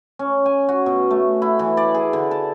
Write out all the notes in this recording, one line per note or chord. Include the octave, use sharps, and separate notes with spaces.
C#4
G#5
F#4
B2
A3
E4
E3
D5
G#4
D3
A5